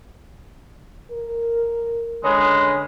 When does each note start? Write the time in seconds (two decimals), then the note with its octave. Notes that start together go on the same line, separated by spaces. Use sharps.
1.11 A#4
2.24 D3 G#3 C#4 B4 D#5